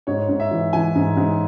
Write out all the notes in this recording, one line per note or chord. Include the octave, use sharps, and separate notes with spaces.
G#2 C#5
G#2
E5
E3
E3 G#5
G#2
G#2